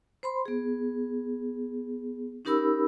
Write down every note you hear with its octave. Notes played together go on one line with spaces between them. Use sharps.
C5 B5 C6
B3 G#4
C#4 D#4 G4 A#4 B5 E6